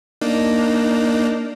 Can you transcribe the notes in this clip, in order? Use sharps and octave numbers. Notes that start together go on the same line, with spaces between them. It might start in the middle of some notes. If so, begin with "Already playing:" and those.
A#3 D4 D#4